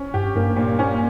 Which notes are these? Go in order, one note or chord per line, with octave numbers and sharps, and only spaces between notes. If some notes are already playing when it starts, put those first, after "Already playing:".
Already playing: C#4
G2 G4
G2 A#3
A#2
C#4